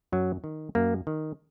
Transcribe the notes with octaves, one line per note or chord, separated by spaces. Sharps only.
F#2 F#3
D#3
F#2 A#3
D#3